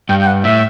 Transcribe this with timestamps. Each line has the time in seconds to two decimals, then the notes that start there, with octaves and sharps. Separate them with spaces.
0.09 G2 G5
0.22 G5
0.27 F#5
0.44 A2 E5